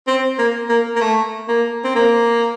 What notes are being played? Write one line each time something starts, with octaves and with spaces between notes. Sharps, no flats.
C4
A#3
A#3
A#3
A3
A#3
C4
A#3